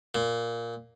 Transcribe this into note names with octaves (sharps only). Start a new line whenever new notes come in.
A#2